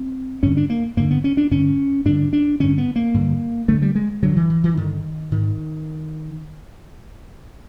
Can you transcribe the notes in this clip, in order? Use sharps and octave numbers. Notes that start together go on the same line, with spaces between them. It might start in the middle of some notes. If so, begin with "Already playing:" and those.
Already playing: C4
G2 D3 C#4
D4
A#3
G2 D3 A#3
B3
C#4
D4
G2 D3 C#4
G2 D3 D4
D4
G2 D3 C#4
B3
A#3
G2 D3
G2 D3 A3
G3
G#3
G2 D3 F#3
E3
E3
E3
G2 D3 D#3
G#2 D#3